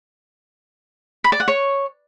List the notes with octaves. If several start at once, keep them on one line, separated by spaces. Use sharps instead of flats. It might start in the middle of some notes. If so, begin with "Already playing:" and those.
B5
D5
F#5
C#5